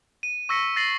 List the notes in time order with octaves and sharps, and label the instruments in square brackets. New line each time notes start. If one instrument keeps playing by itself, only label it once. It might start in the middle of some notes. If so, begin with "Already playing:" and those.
[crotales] D#7
C#6 E6 A#6 B6 C#7
A6 A#6 C7 D#7 F#7